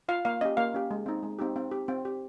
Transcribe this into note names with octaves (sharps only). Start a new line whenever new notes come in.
F4 F5
A#3 F5
C#4 G4 D#5
A#3 F5
C#4 G4
G#3
C4 D#4
G#3
C4 D#4 G4
C4
G4
C4
G4